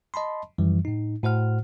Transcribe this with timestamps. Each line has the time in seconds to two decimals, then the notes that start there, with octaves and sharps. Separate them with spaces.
0.14 D#5 A5 B5 C6
0.58 F#2 E3 F3 G3
0.85 A2 D#4
1.23 A2 F#4 C5 F#5 F6